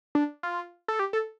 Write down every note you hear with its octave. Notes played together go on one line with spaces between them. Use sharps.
D4
F4
A4
G4
A4